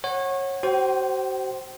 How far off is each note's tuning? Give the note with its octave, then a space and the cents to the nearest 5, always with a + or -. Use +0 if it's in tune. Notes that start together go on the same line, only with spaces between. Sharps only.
C#5 -25 F#5 +0
F#4 +40 C5 +0 G5 -30